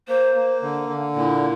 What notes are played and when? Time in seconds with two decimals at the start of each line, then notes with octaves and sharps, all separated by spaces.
0.08 A#3 C5
0.35 A#3
0.62 D3
0.89 D3
1.16 A#2 E4